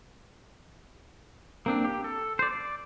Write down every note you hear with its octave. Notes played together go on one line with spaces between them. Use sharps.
A#3 C4 D4
G4
A4
C5 D5
D5